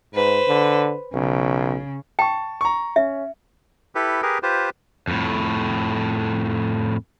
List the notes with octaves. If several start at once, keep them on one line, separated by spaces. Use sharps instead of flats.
G#2 B4 C5
D3
B1 C#3
G5 A5 C#6
A#5 C#6
C#4 E5
E4 G4 A4 B4
G4 G#4 A#4 B4
F4 G4 B4 C5
F2 A2